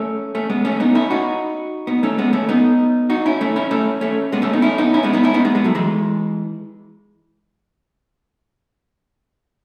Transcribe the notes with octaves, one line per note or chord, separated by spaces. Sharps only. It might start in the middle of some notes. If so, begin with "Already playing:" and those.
Already playing: A3 C#4
A3 C#4
G#3 B3
A3 C#4
B3 D#4
C#4 E4
D#4 F#4
B3 D#4
A3 C#4
G#3 B3
A3 C#4
B3 D#4
D#4 F#4
C#4 E4
A3 C#4
C#4 E4
A3 C#4
A3 C#4
G#3 B3
A3 C#4
B3 D#4
C#4 E4
B3 D#4
C#4 E4
G#3 B3
B3 D#4
C#4 E4
B3 D#4
G#3 B3
G#3 B3
F#3 A3
E3 G#3